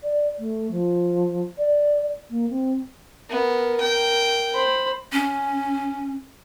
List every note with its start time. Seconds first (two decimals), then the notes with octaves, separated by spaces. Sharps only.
0.04 D5
0.39 A3
0.71 F3
1.58 D5
2.30 A#3
2.49 C4
3.30 B3 A#4
3.80 G5
4.54 C5 B5
5.13 C#4